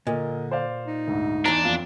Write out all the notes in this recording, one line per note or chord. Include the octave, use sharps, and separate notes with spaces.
A#2 D3 A#4 D#5
C5 D5 F5
D#4
D2 G#2
E2 D4 A#5
F2 A#3 F4